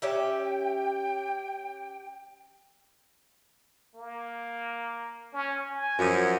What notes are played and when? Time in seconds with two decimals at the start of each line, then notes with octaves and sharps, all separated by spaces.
0.02 C#4 G4 E5 G5
3.95 A#3
5.33 C#4
5.69 G#5
5.99 F#2 F3